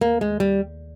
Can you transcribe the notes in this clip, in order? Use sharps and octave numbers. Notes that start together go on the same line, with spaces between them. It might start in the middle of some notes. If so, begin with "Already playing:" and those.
D#2 A#3
G#3
D#2
G3